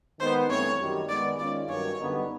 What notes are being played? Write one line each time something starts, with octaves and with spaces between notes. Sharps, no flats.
D#3 G#3 B3 D#4 C5
G2 E3 A3 C4 C#5
F#2 D#3 G3
D#3 G#3 B3 D5
D#3 G#3 C#4 F4 D5
G2 D#3 F#3 A#3 C#4 C#5
F#2 D3 G3 B3 D#4